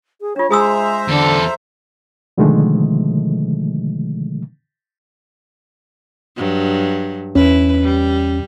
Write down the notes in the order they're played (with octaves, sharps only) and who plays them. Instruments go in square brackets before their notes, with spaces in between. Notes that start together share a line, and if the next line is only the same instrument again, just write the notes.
[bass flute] G#4
[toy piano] D4 F4 [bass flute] C#5
[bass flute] G#3 [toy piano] G#4 D#6 E6 [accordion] C5 E5 A#5
[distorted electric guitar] E2 A4 [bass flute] D3
[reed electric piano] B2 D3 D#3 F3 G#3 A3
[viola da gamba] G2 F#3
[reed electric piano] E2 C#4 [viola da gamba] E4 B4
[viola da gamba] G3